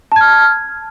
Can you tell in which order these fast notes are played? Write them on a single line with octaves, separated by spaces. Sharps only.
A5 G#6 F6